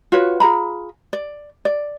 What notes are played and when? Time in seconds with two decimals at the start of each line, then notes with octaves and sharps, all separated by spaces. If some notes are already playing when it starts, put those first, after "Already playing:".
0.12 F4 F#4 B4 C#5
0.40 F4 G#4 A#5 B5
1.13 D5
1.65 D5